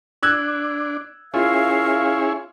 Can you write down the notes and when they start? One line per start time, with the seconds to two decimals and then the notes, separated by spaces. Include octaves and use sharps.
0.23 D4 E6 F#6 G#6
1.34 C#4 E4 F4 G#4 A#4 E5 F5